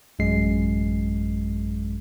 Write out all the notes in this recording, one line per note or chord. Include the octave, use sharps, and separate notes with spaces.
A1 F#2 G#3 C7